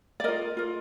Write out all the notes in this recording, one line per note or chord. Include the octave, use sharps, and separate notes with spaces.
D5
F4 A#4 D#5
F4 A#4